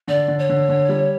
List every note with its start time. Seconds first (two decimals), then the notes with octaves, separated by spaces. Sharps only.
0.08 D3 D5
0.28 D3
0.39 C#5
0.49 D3
0.69 D3
0.89 G3